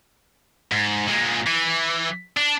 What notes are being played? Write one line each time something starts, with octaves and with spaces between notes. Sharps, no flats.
G#2
A#2 G#3
E3
D4